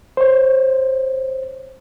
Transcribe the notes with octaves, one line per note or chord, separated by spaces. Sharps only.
C5 C#5